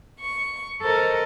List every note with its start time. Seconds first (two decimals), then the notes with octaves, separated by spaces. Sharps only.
0.19 C#6
0.82 A4 A#4 C5 D#5